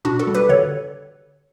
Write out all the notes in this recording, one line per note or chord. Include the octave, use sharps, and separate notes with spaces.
B2 D4 F#4
F#4 A4
G3
G4 B4
D3 A4 C#5